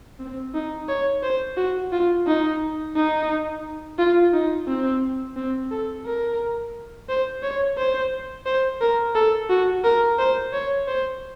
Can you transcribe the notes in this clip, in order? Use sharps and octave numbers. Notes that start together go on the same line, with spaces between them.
C4
D#4
C#5
C5
F#4
F4
D#4
D#4
F4
D#4
C4
C4
A4
A#4
C5
C#5
C5
C5
A#4
A4
F#4
A#4
C5
C#5
C5